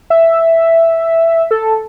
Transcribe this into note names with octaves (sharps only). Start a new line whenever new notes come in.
E5
A4